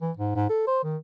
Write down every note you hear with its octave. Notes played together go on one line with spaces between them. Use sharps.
E3
G#2
G#2
A4
C5
D#3